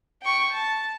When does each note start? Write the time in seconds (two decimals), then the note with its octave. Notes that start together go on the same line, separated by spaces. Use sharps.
0.22 G5 C#6
0.53 A5